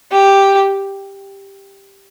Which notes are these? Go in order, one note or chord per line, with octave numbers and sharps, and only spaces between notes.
G4